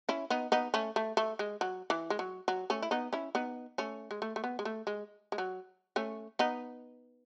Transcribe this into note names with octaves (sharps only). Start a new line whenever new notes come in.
C#4 E4
B3 D#4
B3 D#4
A3 C#4
A3
A3
G#3
F#3
E3
G#3
F#3
F#3
A3 C#4
E4
B3 D#4
C#4 E4
B3 D#4
A3 C#4
G#3
A3
A3
B3
G#3
A3
G#3
G#3
F#3
A3 C#4
B3 D#4